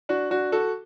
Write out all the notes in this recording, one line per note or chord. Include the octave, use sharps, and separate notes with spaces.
D4 F#4
D4 F#4
F#4 A4